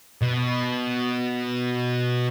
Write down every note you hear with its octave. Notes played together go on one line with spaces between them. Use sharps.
B2